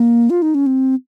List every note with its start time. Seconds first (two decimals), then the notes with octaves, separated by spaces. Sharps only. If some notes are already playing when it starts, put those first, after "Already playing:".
Already playing: A#3
0.30 F4
0.42 D#4
0.55 C#4
0.66 C4